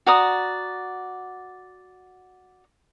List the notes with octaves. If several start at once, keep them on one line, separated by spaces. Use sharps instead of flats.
F#4 D5 A#5 D#6